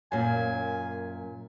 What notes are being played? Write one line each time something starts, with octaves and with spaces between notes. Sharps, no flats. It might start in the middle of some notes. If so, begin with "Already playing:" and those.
F#2 A#2 G#5